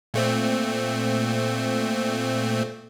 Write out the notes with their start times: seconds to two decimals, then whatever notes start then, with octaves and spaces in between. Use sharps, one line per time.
0.14 A#2 A3 C4